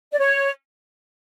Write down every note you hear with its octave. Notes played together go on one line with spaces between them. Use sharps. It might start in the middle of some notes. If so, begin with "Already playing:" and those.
D5
C#5